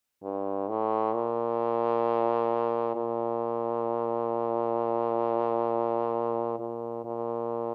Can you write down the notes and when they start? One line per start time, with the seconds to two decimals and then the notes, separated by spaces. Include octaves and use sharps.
0.23 G2
0.68 A2
1.14 A#2
2.95 A#2
6.59 A#2
7.05 A#2